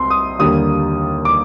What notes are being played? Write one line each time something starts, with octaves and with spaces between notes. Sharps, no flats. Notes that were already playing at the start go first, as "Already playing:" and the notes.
Already playing: C2 C4 C6
D#6
D#2 D3 G3 A#3 D#6
D6